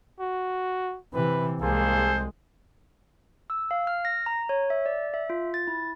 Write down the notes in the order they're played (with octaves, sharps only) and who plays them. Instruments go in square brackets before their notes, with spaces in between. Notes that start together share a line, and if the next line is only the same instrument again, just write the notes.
[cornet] F#4
[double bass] C3 E3 [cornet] B4
[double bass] C2 G#3 [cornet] A#3 [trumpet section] G#4 A4 C5
[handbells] E6
F5
F6
A#6
A#5
C#5
E5
D5
E5
F4
A6
E4